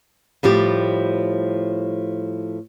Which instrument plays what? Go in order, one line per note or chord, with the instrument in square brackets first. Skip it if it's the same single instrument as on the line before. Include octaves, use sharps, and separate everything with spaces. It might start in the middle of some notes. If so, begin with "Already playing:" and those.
[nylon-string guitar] A2 F3 G3 G4